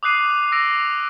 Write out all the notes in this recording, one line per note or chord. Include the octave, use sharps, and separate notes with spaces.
D6 D#6 F#6 C7 D#7 F7
D6 E6 A#6 D7